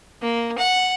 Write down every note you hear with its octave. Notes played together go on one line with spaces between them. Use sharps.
A#3
F#5